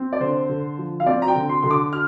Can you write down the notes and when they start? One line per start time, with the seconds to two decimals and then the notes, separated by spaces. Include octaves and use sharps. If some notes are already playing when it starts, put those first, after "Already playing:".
Already playing: C4
0.13 D5
0.20 D3 C5
0.49 D3
0.78 F3
1.00 F5
1.06 C4 D5
1.22 A#5
1.28 G5
1.35 D3
1.49 C6
1.62 D3 C6
1.71 D6
1.93 F6